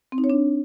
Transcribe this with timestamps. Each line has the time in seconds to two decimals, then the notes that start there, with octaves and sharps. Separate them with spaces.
0.12 C4
0.18 D#4
0.24 C#5
0.30 D4